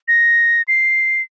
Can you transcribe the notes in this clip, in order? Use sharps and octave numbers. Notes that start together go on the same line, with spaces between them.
A#6
C7